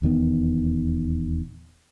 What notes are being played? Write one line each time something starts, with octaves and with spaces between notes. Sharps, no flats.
D#1 E2 D#3 B3